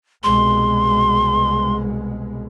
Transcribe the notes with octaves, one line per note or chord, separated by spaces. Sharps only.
C2 B2 G#3 C6